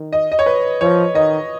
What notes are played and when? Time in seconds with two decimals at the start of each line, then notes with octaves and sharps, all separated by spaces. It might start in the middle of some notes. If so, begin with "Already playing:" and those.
Already playing: D#3
0.13 D#5
0.32 D#5
0.39 C#5
0.46 B4
0.81 F3 C#5
1.14 D#3 D#5